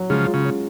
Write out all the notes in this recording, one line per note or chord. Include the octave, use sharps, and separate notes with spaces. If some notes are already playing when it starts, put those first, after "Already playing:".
Already playing: F#3
C#3 F3 G#3
F4
C#3
C#4